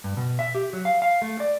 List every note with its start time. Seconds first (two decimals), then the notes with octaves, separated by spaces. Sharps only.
0.04 G2
0.17 B2
0.39 E5
0.55 G4
0.73 F#3
0.85 F5
1.02 F5
1.22 A3
1.40 D5